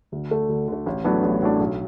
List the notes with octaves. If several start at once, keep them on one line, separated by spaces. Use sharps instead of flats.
D2
D3 A3
D2
D3 A3
A1
A2 F#3 B3 D4
A1
A2 F#3 B3 D4
B1